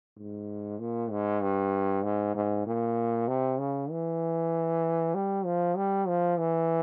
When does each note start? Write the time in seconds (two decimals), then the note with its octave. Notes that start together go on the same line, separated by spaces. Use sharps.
0.18 G#2
0.79 A#2
1.11 G#2
1.42 G2
2.04 G#2
2.35 G#2
2.66 A#2
3.28 C3
3.59 C#3
3.90 E3
5.15 G3
5.45 F3
5.76 G3
6.08 F3
6.39 E3